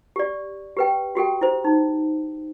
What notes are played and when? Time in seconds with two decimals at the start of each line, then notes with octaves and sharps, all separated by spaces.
0.16 G4 D5
0.77 G4 B4 G5
1.15 F#4 G4 A4 G5
1.41 E4 C5
1.64 D#4